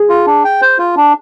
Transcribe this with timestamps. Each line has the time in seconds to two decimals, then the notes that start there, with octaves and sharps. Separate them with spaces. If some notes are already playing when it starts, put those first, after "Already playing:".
Already playing: G#4
0.09 F4
0.27 D4
0.44 G5
0.61 C5
0.78 F4
0.97 D4